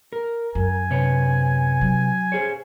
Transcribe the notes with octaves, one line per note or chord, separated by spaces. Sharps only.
A#4
F#2 G#5
C3 B4 C#5
F#3
G#4 C5 C#5